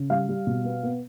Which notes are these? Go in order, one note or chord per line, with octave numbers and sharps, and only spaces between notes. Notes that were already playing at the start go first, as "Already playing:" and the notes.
Already playing: C#3
G3 F5
G3
B2
B3
B3